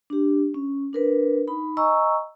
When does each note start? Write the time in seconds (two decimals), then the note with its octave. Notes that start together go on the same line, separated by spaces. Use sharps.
0.10 D4 G4
0.54 C#4
0.93 D4 A#4 B4
1.48 D#4 B5
1.77 D#5 G#5 A#5 C#6 E6